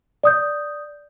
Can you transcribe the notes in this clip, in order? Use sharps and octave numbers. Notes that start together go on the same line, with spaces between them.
D5 D#6 G6